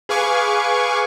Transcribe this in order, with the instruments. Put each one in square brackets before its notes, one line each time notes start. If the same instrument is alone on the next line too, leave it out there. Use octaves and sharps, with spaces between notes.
[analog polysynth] G#4 B4 F5 G#5 C#6 D6